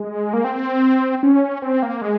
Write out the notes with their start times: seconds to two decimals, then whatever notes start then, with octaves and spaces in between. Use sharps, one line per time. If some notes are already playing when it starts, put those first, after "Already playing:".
Already playing: G#3
0.33 A#3
0.44 C4
1.23 C#4
1.62 C4
1.83 A#3
2.02 G#3